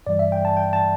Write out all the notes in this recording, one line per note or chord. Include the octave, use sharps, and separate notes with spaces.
G2 E3 G3 D5
E5
G5
A5
G5
A5